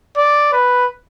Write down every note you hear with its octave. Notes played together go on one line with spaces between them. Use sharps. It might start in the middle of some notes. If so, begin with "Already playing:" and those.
D5
B4